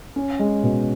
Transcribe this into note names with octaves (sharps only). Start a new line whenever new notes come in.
C#4
G#3
B2